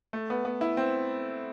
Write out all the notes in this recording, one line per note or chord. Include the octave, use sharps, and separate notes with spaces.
A3
B3
B3
E4
C4